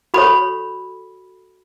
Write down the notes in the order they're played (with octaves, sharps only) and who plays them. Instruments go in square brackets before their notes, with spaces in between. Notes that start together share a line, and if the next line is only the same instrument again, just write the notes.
[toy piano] F#4 A4 C#5 B5